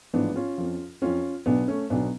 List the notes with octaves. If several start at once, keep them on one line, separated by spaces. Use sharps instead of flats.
A1 G#2 F3 B3 D4
C#4 F4
F2 F3
F2 F3 C#4 F4
B1 B2 F#3 B3 D4
A3 C#4
B1 B2 F#3 B3 D4